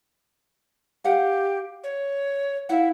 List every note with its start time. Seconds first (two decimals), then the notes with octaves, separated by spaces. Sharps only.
1.04 G4 F5 F#5
1.84 C#5
2.69 E4 F5 F#5